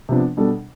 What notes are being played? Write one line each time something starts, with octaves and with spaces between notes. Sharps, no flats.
C3 F3 B3 D4
B2 G3 D4 A4